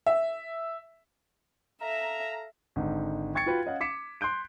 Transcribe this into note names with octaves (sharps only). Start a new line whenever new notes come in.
E5
A4 E5 F5 A#5
G#1 D3 D#4
G5 C#6 G#6 A6 C#7
F4 F#4 B4 G5
C#4 D#5 F5 F#5
D6 B6 C#7 E7
C6 F#6 G6 D7